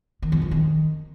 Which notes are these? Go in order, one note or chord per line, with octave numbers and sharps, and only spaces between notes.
D#3
F2
C3
D#3